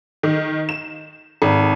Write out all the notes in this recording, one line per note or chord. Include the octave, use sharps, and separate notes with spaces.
D#3
E7
G#1